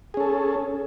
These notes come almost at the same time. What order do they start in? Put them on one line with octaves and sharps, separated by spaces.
G#4 C#4 A4